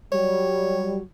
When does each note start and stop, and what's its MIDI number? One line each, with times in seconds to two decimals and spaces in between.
0.12 1.00 54
0.12 1.00 55
0.12 1.02 73